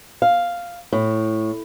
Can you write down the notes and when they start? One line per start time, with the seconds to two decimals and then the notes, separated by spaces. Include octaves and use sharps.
0.22 F5
0.92 A2